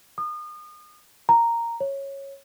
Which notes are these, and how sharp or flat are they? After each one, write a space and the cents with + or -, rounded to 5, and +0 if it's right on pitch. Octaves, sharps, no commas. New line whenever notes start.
D#6 -35
A#5 -5
C#5 -10